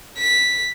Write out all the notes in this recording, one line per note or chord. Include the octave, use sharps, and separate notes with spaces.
B6